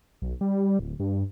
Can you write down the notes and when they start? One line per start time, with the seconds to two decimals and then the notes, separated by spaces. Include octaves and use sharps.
0.22 B1
0.41 G3
0.79 D1
1.00 G2